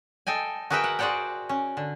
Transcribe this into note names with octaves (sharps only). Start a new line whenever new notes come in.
A4 D#5 G5 G#5
F#4 G#4 A#4 B4 E5 G5
F#5
F#4 G#4 C5 D5 F#5 G5
C#4
D3